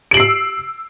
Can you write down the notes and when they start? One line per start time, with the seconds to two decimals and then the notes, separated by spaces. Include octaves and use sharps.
0.11 D7
0.14 F#7
0.17 C7
0.20 E6